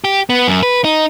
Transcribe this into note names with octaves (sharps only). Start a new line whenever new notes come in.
G4
B3
F#2
B4
D#4